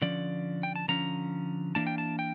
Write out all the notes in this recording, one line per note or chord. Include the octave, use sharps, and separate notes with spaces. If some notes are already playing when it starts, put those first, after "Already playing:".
D3 F3 C#4 D5
G5
A5
D3 F3 C#4 A#5
E3 A#3 D4 A5
G5
A5
G5